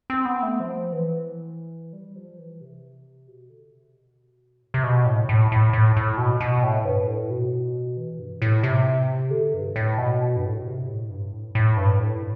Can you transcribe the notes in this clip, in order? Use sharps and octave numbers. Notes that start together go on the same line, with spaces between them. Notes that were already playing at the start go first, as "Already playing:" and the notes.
C4
B3
A3
F3
E3
G3
F3
E3
C3
B2
D3
C3
B2
A2
C3
B2
A2
A2
A2
A2
A2
B2
B2
A2
G2
A2
B2
E3
G2
A2
C3
D3
G2
A2
B2
G2
A2
B2
C3
A2
G2
A2
A2
G2
A2